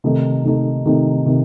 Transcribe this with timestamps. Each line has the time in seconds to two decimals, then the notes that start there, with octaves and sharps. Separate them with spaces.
0.04 C3 D#3 A3 D#4
0.44 C3 D#3 A3 D#4
0.86 C3 D#3 A3 D#4
1.26 C3 D#3